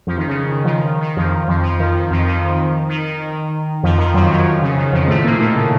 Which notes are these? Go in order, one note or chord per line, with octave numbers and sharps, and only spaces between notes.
F2 F3
D#3
C#3
F3
D#3
D#3
F2 F3
F2 F3
F2 F3
D#3
D#3
F2 F3
D#3
D#3
D#3
F2 F3
D#3
F#2 F#3
F2 F3
C#3
D#3
F2 F3
A2 A3
A#2 A#3
D#3
C#3